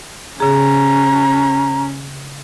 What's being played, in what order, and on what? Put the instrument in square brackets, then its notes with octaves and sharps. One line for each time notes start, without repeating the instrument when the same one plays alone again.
[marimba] C#3 G#4 [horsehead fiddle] C#4 [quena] A#5